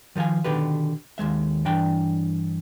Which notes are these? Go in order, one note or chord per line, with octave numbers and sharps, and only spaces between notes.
D#3 F3 A4 F5 G#5
B2 D3 D#3 G4 B4
D#2 G#2 G#3 E5
G2 E3 D4 G5